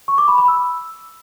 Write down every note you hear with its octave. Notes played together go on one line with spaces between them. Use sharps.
C#6
D6
B5
B5
E6